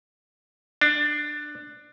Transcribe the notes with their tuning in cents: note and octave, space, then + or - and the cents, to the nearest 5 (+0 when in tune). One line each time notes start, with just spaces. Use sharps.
D4 +15